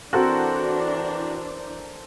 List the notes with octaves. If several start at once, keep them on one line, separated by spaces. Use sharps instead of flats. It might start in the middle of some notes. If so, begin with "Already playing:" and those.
E3 C4 D4 F#4 A4 A#4 C5 D5